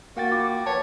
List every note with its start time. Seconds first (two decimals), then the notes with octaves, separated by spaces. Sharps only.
0.17 A#3 F#4 G5 A6
0.32 F4 D6
0.66 B4 C#5 F5 A5